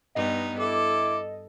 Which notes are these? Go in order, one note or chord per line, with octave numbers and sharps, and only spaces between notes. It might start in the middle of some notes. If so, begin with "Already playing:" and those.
G2 B3 D#4 D#5
E4 A4 D6